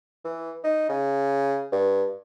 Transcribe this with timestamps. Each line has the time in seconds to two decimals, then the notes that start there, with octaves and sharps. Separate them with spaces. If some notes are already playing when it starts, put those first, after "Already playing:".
0.25 E3
0.64 D#4
0.89 C#3
1.72 G2